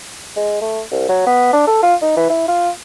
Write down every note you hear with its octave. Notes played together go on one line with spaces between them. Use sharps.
G#3
A3
C2
F#3
B3
D4
A4
F4
D#4
E3
E4
F4